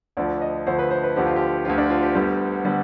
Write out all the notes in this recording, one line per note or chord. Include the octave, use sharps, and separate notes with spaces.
D2 D3 F3 D5
D#5
D2 D3 F3 C5
B4
C5
B4
D2 D3 F3 G4
F4
G4
D2 D3 F3 F4
D4
F4
G4
D2 D3 G3 B3
D3 G3 B3